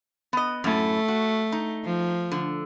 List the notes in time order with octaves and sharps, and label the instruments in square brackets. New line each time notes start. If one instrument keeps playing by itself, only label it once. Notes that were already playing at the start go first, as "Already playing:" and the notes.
[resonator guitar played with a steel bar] B3 D#5
[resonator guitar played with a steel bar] F#2 A2 [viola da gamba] A3
[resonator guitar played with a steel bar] F#4
D#4
[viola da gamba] F3
[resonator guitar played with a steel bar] D3